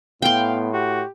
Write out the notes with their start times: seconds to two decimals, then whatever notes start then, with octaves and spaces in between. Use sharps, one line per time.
0.22 A2 B3 F5 G5 C6
0.73 F#4 G4